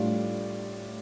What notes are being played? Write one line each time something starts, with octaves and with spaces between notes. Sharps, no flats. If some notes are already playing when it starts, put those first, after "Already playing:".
Already playing: A2 G3 D4 F4 D5